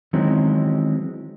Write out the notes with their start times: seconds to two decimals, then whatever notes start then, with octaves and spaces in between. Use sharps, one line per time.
0.13 D#3 E3 F#3 G#3 C4 C#4